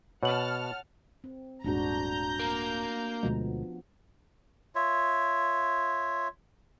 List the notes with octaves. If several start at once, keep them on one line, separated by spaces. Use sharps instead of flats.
B2 C#5 F#5 A5 F6 F#7
C4
D#1 G#2 A3 D4 F#4 A#5 G6
A#3
D2 B2 F3 G#3 B3
F4 C#5 E5